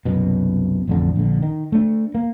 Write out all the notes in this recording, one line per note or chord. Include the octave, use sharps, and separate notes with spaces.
C2 F#2 B2
A1 F2 D3
A#1 D3
D#3
A3 D4
A#3